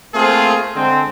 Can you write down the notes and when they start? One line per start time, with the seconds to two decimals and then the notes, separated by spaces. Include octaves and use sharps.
0.14 A3 A#3 C4 F4 G#4
0.76 D3 G#3 C4